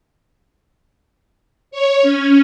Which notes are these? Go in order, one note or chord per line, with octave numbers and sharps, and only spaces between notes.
C#5
C#4